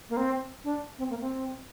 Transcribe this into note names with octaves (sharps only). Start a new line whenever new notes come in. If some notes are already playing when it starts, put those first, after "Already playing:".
A#3
C4
D4
C4
A#3
C4